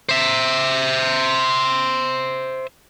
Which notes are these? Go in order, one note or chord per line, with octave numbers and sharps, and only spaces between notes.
C5 E5